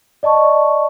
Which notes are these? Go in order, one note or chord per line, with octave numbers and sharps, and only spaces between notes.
D5 D#5 A5 C#6